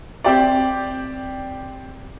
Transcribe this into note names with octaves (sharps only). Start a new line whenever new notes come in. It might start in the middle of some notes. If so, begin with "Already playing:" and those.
C4 G4 D5